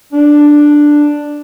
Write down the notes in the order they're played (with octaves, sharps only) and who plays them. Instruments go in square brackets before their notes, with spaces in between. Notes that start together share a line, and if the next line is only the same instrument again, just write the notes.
[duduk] D4